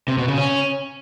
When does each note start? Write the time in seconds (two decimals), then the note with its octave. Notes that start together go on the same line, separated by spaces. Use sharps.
0.08 C3
0.18 B2
0.28 C#3
0.38 C#4